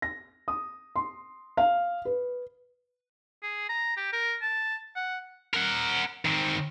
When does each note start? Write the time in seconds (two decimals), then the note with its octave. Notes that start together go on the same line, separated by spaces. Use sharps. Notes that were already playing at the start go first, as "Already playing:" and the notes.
0.02 A#6
0.48 D#6
0.96 C6
1.57 F5
2.05 B4
3.43 G#4
3.69 A#5
3.97 G4
4.13 A#4
4.42 A5
4.96 F#5
5.54 A#4 F#5
6.25 D#3 C4